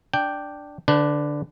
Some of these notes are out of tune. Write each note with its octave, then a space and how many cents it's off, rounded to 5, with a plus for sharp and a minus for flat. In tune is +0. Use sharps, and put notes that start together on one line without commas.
D4 +0 G5 +0
D3 +0 D4 +0 B4 +35